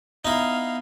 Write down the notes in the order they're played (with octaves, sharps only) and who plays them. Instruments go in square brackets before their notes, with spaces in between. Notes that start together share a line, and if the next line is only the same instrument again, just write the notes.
[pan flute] B3 [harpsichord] D#4 E4 [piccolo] F5